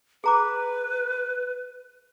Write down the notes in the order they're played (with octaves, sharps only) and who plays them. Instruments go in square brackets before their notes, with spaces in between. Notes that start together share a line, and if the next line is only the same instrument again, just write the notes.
[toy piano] G#4 A#5 D6 [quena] B4